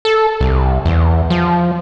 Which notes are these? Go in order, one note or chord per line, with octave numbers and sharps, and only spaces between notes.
A4
C2
E2
F3